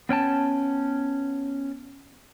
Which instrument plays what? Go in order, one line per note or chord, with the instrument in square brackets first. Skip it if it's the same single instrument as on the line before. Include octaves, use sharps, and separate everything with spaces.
[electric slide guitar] B3 C#4 G5 A5